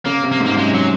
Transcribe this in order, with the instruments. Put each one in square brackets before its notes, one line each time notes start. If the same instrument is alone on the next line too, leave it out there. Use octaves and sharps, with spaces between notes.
[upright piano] C#3 [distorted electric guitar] A#3
[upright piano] C3
[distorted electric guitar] A#3
[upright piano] G#2
[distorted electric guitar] A#3
[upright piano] G#2
[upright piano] F#2 [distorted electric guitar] G#3
[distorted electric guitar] F#3